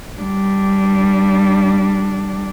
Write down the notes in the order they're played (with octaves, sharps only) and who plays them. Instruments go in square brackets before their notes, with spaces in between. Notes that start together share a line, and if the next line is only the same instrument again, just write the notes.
[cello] G3 D4